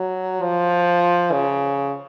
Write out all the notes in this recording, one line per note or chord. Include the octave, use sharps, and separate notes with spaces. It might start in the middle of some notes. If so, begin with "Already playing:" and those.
Already playing: F#3
F3
C#3